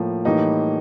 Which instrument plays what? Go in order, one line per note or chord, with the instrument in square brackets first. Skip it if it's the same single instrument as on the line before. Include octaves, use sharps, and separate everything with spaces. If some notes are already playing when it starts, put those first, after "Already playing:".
Already playing: [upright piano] A2 F3 A#3
A2 E3 G3 A#3 D#4